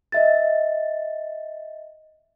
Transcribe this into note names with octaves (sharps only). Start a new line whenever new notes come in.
D#5 E5 A6